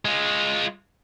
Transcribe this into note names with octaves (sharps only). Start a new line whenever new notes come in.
G#3 F4